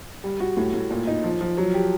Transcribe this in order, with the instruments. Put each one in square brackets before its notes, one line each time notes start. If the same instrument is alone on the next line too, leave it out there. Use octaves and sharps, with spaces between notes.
[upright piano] G3
F#4
A2
A2
A#2
D#4
F3
F3
F#3
G4